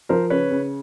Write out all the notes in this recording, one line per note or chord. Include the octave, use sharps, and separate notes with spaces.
F3 A#4 C5
C#3 B4 C#5
C#3